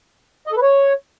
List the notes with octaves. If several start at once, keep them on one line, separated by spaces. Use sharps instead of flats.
D#5
A4
B4
C#5